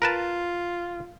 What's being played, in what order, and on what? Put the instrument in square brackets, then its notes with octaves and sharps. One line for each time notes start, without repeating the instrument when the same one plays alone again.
[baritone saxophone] F4 [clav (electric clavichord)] A#4 B4 A5